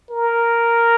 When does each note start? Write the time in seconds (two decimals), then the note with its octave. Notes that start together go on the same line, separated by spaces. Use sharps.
0.10 A#4